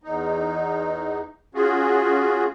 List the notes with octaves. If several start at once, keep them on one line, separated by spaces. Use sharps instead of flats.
E2 D#4
C#4 F4 F#4 G#4